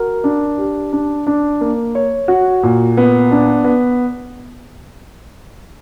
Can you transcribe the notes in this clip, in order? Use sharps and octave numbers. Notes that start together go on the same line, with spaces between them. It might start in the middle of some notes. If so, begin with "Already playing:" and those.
Already playing: F#4 A#4
D4
G4
D4
D4
A#3
C#5
F#4
A#2
B3
D4
B3